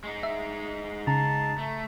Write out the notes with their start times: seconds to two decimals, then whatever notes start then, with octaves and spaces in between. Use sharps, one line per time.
0.04 G#3 D#4
0.23 E5
1.07 C#3 A5 A#5
1.58 A3